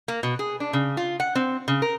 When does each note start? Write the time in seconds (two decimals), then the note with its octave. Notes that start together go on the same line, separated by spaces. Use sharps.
0.08 A#3
0.23 B2
0.39 G#4
0.60 D4
0.73 C#3
0.97 F4
1.20 F#5
1.35 C4
1.68 C#3
1.82 A#4